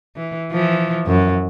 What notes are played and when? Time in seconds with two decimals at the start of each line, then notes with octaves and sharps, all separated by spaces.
0.16 E3
0.51 E3 F3
1.06 F#2